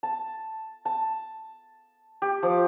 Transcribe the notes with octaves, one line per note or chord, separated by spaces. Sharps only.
A5
A5
G4
F3